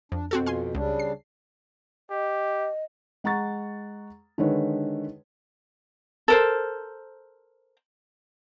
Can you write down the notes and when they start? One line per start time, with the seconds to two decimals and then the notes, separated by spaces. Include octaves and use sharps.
0.12 F2 D4
0.31 F2 B2 C4 F#4 A4
0.46 F5 G#5 C6
0.75 C#2 C#3 G3 D4
0.99 C7
2.10 G4 D#5
3.24 G#3 F#5 A#5 C#6 A6
4.38 D3 D#3 G#3 B4 C#5
6.28 A4 A#4 C5